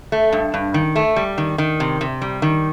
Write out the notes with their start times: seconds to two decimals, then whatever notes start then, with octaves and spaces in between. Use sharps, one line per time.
0.12 A3
0.32 G2
0.54 G2
0.74 D#3
0.96 A3
1.16 G3
1.38 D#3
1.58 D#3
1.80 C3
2.01 C3
2.22 G3
2.42 D#3